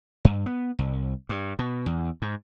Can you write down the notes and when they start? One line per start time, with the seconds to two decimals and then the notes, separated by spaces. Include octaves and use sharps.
0.25 G2
0.46 B3
0.79 C2
1.29 G2
1.59 B2
1.86 E2
2.22 G#2